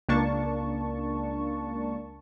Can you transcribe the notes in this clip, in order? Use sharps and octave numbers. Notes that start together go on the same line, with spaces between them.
C#2 A#3 D4 A5 C#6